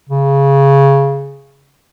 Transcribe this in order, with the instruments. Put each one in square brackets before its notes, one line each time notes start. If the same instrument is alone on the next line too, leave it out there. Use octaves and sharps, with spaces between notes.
[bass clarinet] C#3